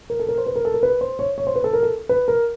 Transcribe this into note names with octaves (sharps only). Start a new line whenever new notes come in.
A#4
A4
A#4
C5
B4
A#4
A4
A#4
B4
C5
C#5
C#5
C5
B4
A4
A#4
A4
B4
A#4